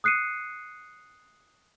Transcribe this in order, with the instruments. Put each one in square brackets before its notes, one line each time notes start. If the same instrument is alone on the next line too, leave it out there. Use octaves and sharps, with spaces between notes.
[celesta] D#6 F#6 C7 C#7 D#7